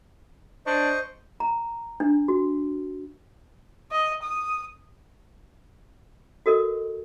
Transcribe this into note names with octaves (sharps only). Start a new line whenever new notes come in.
D4 C5 D#5 C#6
A#5
D4
F#4
D#5
D#6
F#4 A4 A#4 D#5